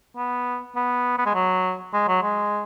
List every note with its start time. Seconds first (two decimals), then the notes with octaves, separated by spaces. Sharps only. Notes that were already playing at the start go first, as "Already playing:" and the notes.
0.17 B3
0.76 B3
1.18 B3
1.26 G#3
1.34 F#3
1.93 G#3
2.08 F#3
2.23 G#3